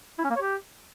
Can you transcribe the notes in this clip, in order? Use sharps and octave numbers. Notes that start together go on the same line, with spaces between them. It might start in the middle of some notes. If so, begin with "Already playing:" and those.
E4
C#4
A#3
C#5
G4